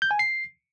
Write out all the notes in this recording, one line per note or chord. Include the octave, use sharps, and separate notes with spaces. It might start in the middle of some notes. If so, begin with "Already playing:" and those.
G6
G#5
C7